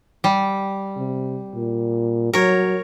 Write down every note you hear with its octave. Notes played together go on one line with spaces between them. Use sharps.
G3
C3
A#2
F#3 A#4 C#5